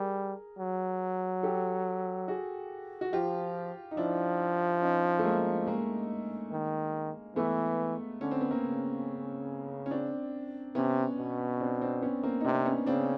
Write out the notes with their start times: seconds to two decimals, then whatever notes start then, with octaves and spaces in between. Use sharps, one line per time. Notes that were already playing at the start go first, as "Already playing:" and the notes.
Already playing: G3 G#4 A#4
0.58 F#3
1.43 G4 A4
2.28 F#4 G#4
3.01 F#4
3.13 F3 F4 G4
3.91 D#4
3.97 F3 D4 E4
4.82 C#4 D#4
5.19 A3
5.24 G#3 A#3
5.66 G#3 A#3
6.52 D#3
7.36 E3 A3 B3
8.21 D3 C#4
8.31 C4
8.41 B3
8.51 A#3 C4
8.63 C#3
9.86 C#4
9.91 C4 D4
10.75 C3 B3 C#4
11.18 B2
11.60 C4 D4
11.81 C4 D4
12.02 B3 C#4
12.23 A#3 C4
12.40 D#4
12.45 C3 C4 D4
12.66 B3 C#4
12.86 C#3 C4 D4